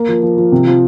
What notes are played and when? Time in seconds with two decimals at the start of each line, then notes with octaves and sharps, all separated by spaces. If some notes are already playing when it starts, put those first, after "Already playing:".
Already playing: A#3
0.08 F3
0.23 F3
0.38 F3
0.52 C3
0.67 F3